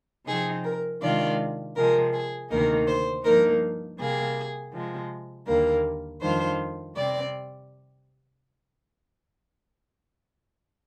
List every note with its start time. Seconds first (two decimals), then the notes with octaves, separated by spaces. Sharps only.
0.27 C3 F3 C4 D#4 G#4
0.64 A#4
1.02 C3 D#3 G#3 D4 F4 D5
1.76 C3 F3 G#3 A#4
2.13 G#4
2.50 D2 C3 D#3 A#3 D#4 A#4
2.88 C5
3.24 G2 F3 A#3 D#4 A#4
3.99 C3 G3 A#3 G#4
4.73 C3 F3 G#3
5.47 D#2 D3 G3 A#3 A#4
6.21 F2 D#3 G3 D4 F4 C5
6.96 C3 G3 C4 D5